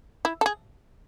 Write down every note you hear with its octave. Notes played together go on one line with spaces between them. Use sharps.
E4
A4
G#4